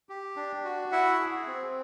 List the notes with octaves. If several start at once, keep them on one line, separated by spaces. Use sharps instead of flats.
G4
D4
F#4
E4 E5 F#5
G#4
C4